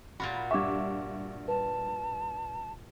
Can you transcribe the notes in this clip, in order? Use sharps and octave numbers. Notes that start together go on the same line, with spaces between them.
A#2 F4 F#4 B5 A6
G2 E5 C#6 D6 G#6
B4 A5